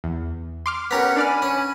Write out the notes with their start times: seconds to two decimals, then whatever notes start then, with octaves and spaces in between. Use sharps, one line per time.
0.04 E2
0.66 C6 D6 F6
0.91 B3 C#4 G4 A#4 F#5 A#5 B6
1.16 D4 D5 G#5 B5 F6
1.42 C#4